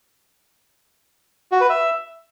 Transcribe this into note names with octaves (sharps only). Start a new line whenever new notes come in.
F#4
B4
E5